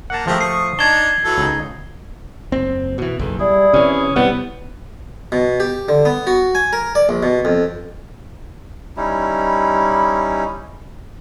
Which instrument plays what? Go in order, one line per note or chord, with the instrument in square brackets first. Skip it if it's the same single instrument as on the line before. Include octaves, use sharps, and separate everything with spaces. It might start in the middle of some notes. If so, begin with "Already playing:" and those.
[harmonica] A#3 [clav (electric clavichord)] F#5 A5
[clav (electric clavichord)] F3 A3 [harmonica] G4 G#4 A#4
[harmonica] C#6 D#6 [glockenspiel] C7
[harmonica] D4 D#4 [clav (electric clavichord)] A5 [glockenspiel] G#6 G7
[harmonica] E3 F#3 A4
[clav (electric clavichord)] C#2 D#4
[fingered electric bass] F#1 C4
B2 E3
[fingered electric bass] F#1 B1 E2 [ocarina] A4
[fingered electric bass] G3 [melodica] E4 G#4 [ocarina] D5
[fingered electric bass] C3 E3 [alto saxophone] C#4
[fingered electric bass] C3 G3 [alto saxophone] B3 [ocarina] E4
[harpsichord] B2
G4
D3
B3
F#4
G#5
A#4
D5
A#1
B2
F2
[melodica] G3 C#4 D#4 E4